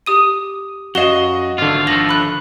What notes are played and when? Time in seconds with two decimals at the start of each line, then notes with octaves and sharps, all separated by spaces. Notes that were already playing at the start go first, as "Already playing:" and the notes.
0.06 G4 D#6 D#7
0.95 F#2 F#4 D#5 F5 E7 G7
1.58 G#1 D3 A3 F4
1.87 F3 G3 A3 A#6
2.09 B5 F#6